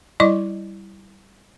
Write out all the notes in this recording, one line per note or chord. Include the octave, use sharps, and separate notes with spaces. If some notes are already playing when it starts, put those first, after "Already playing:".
G3 E4 D5 D#5 C#6 D6